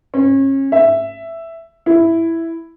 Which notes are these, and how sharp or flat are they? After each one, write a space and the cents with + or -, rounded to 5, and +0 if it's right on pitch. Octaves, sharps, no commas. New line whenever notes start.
C#4 -30
E5 +5
E4 +0